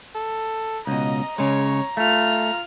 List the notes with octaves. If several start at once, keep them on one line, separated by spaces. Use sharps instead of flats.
A4
C#2 B2 D#5 A#5
C#3 G#3 C#5
A3 F4 F6